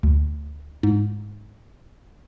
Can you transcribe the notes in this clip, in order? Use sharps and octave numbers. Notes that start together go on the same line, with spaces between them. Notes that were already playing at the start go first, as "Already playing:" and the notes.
D2
G#2